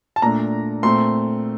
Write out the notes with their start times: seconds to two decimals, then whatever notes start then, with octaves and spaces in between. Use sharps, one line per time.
0.16 A5
0.22 A#2 A3 D4 A#5
0.83 A#2 A3 C4 C6